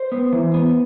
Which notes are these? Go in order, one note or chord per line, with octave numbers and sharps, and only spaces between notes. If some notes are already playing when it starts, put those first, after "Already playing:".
Already playing: C5
B3
E3
B3